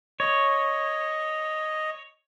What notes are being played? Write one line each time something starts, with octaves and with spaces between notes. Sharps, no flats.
C#5 D#5